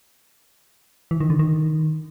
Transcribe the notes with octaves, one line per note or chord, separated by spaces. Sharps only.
E3
D#3
D3
D#3